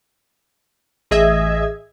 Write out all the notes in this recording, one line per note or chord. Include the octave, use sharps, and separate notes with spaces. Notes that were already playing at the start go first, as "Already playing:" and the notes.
A1 G#4 D#5 E5 G#6